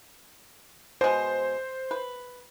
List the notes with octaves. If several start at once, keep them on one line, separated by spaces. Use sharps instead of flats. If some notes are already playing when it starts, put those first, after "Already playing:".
B2 G#3 C5
B4